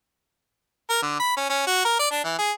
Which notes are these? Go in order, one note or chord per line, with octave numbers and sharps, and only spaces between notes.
A#4
D3
B5
C#4
C#4
F#4
A#4
D5
D4
E3
G#4